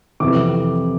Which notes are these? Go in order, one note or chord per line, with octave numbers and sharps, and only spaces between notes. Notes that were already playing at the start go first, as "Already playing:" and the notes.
F2 C3 E3 D6